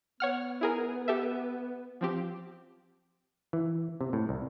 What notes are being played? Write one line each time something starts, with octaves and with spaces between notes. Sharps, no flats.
B3 C#5 F#5 F6
E4 G#4 A#4
G4 A4 E5
F3 C4 G4
E3
C3
A2
C2